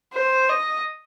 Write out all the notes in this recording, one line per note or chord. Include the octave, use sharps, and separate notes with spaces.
C5
D#5